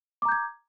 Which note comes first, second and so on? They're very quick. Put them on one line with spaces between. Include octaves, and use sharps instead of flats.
D6 A#5 G6 G#6